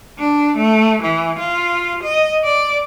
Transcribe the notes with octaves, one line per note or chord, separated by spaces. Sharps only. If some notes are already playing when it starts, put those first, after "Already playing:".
D4
A3
E3
F4
D#5
D5